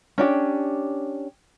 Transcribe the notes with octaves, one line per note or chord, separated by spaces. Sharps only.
C#4 D4 G4